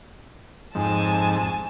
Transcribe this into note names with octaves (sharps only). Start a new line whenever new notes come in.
F2 G#2 G#5 A5